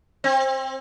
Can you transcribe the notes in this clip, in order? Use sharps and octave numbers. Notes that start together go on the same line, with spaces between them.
C4